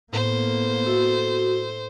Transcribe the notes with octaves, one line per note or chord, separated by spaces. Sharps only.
A2 A#3 B3 C5
F#4 A4 E5